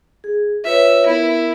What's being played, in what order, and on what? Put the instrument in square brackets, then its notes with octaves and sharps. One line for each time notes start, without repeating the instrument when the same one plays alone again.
[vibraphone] G#4
[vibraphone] F4 B4 C#5 [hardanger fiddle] E5
[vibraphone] B3 A#4 [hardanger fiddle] E4